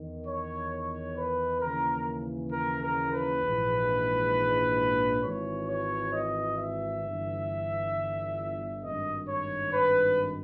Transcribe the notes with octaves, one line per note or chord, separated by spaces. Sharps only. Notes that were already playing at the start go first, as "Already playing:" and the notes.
Already playing: E2 D#3
C#5
C#5
B4
D#2 C#3 E3 A#4
A#4
A#4
B4
A#1 G#2 E3
G#1 G#2 E3 C#5
C#5
D#5
E5
G1 G2 E3
G#1 G2 D#3 D#5
C#5
B4